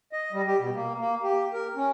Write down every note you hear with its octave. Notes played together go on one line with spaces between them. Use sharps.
D#5
G3
G4
B2
A#3
A#3
G4
A#4
C#4